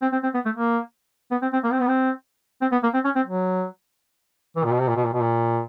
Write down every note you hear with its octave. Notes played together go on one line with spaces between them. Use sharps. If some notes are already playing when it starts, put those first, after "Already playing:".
C4
C4
C4
B3
A3
A#3
B3
C4
C4
A#3
C4
B3
C4
C4
B3
A#3
C4
C#4
C4
F#3
E3
A#2
B2
C3
A#2
B2
A#2
B2
A#2